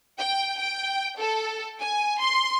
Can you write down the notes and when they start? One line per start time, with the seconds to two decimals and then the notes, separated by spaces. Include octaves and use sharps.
0.19 G5
0.59 G5
1.20 A4
1.81 G#5
2.21 C6